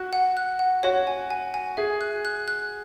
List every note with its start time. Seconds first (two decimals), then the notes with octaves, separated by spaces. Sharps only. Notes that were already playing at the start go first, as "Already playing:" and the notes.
Already playing: F#4 F#6
0.13 F#5
0.37 F#6
0.59 F#5
0.83 F#4 C#5
1.07 G#5
1.30 G#5
1.54 G#5
1.77 G#4 E5
2.01 F#6
2.25 F#6
2.48 F#6